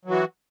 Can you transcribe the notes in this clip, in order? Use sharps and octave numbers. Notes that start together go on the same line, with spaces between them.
E3 F#3 F#4